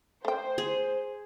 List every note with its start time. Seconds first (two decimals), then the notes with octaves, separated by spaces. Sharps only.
0.25 A3 C5 G5
0.58 G#4